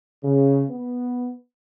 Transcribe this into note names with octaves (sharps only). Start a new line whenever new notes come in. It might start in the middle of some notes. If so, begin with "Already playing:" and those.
C#3
B3